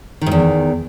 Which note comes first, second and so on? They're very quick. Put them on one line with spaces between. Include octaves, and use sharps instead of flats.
D#3 G#2 E2